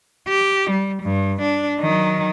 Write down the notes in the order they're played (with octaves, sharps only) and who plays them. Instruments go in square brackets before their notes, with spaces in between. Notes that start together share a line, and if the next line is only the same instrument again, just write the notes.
[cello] G4
G3
G2
D4
D#3 F#3